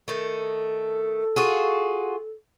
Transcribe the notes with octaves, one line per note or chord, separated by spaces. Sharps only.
D#3 A3 A4
F4 F#4 G#4